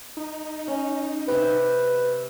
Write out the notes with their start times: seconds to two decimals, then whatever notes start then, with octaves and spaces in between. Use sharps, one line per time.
0.17 D#4
0.68 C#4
1.28 C3 G4 B4